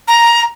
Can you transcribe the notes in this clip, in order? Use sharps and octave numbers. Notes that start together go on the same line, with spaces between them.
A#5